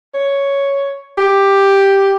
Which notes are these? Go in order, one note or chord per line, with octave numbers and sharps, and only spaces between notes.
C#5
G4